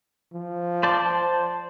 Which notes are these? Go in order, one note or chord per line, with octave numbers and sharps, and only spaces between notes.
F3
C5 D5 A5